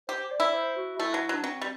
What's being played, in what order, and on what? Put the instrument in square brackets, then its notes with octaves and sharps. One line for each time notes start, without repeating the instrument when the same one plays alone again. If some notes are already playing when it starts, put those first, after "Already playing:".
[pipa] G4 [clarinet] C5
[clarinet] D5
[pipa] E4
[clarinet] C5
F#4
[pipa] A3 [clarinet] E4
[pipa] F#3
[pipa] F#3 [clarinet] D4
[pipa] F#3 [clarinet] C4
[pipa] G3